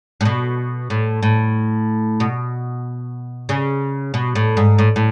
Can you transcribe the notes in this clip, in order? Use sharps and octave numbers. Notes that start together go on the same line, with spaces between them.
A2
B2
A2
A2
B2
C#3
B2
A2
G#2
A2
A2